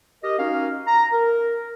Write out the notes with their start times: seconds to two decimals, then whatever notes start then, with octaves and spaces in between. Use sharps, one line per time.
0.23 G4 A#4 D#5
0.38 C#4 D#4 F#4 A#4 F5
0.87 A#5
1.12 A#4